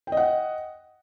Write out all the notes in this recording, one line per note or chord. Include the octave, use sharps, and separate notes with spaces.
D#5 F#5 G5